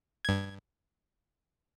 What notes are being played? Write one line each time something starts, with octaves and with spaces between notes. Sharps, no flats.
G2 G#6